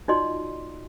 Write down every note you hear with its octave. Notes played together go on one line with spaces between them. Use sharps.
D#4 F4 F#4 D5 D#5 C6